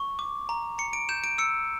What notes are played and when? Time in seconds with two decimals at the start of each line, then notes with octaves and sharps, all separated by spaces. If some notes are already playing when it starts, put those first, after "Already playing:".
Already playing: C#6
0.19 D6
0.49 A#5
0.78 A#5 C#7
0.93 D7
1.09 G6 E7
1.24 D7
1.38 E6 C#7